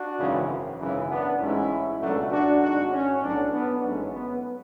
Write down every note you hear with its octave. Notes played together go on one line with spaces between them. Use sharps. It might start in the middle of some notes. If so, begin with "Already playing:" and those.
Already playing: D4 F#4
G#1 F#2 C#3 E3
G#1 F#2 C#3 E3
B3 D4
A1 G#2 G#3 C#4 E4
C#2 B2 F#3 A3 D4 F#4
D4 F#4
G#1 G#2 G#3 D4 F#4
C#4
B1 A2 F#3 B3 D4
B3 D4
A1 G#2 F#3 A3 C#4
B3